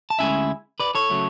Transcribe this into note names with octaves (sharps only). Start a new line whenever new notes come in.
A5
D2 C#3 G#3 C#4 E4 E5 G#5
B4 D5
A4 C#5
C#3 F#3 A3